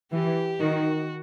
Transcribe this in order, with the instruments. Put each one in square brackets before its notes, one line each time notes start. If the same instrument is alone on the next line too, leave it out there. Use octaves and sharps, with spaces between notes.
[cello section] E3 [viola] G4
[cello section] D#3 [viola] F#4